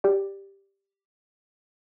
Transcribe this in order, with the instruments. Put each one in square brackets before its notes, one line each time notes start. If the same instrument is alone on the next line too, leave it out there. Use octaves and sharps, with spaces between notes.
[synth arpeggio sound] G4 D5